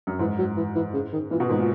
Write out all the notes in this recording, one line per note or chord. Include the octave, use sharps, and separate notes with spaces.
F#2
G#2 E3
F#3
E3
E3
C#3
D#3
A#2 E3
B2
G#2 D#3
A#2